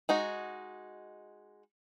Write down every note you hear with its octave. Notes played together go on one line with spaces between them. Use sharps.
G#3 D#4 F#4